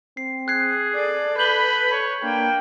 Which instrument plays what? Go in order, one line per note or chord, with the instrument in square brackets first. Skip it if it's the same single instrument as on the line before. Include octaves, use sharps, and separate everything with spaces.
[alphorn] C4 [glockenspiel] C7
[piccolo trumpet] G#4 [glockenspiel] F#6 G#6 C7
[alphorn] A4 [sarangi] D5
[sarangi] B4 [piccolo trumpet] B5 [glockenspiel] G6 F#7 G7
[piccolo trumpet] C#5
[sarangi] A#3 [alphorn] D4 [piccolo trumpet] G5